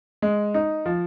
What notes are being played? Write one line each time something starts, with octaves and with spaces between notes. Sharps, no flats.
G#3
D#4
F3